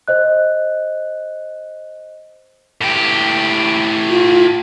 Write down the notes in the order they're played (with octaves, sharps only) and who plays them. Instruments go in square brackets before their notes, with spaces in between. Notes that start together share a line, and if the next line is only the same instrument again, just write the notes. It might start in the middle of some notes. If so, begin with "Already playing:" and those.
[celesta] C5 D#5 F#6
[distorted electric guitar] A2 G4
[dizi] F4